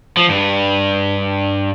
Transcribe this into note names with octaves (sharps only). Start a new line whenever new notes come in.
F3
G2